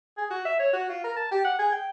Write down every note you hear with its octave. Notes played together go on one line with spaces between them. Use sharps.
G#4
F#4
E5
C#5
F#4
F4
A#4
A5
G4
F#5
G#4
G5